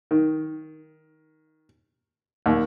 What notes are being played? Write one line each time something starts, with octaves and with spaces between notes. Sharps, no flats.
D#3
D#2